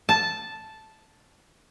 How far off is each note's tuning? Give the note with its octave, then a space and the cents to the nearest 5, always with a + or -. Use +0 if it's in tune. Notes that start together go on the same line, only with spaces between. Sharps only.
A5 -5